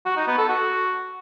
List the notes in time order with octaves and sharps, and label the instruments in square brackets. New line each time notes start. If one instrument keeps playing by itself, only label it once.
[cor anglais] F#4
D#4
B3
A4
F#4